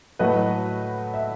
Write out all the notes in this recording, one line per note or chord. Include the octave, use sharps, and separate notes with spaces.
A2 F#3 A3 B4 D#5
E5